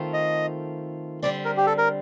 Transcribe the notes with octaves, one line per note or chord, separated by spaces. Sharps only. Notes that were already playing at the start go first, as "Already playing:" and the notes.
Already playing: D#3 A3 C4 F4 A4
D#5
D3 G3 C4 D5
A#4
G4
A4
A#4